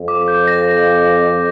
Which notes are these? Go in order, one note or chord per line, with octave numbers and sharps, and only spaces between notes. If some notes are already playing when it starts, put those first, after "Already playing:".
Already playing: F2
D6
G6
A#6